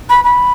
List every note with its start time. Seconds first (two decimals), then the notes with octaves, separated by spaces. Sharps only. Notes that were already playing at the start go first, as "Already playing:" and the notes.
0.09 B5
0.24 B5